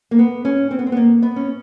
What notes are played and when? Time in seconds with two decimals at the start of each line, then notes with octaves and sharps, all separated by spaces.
0.11 A#3
0.19 B3
0.45 C#4
0.71 C4
0.79 B3
0.87 C4
0.92 B3
0.97 A#3
1.22 B3
1.36 C#4